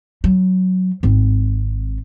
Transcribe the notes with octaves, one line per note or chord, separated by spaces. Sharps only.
F#3
G#1 C4